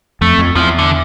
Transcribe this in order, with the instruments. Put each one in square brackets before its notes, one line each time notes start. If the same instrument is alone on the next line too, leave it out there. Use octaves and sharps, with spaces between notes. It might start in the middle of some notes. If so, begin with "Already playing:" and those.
[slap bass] F2 [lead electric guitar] A3
[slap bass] F2
[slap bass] E2 [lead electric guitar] F3
[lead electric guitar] D3